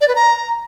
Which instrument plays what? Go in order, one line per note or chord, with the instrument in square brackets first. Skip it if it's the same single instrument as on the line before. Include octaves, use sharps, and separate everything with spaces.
[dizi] D5
B4
A#5